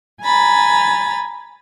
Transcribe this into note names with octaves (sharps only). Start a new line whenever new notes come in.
G#5 A#5 B5 A6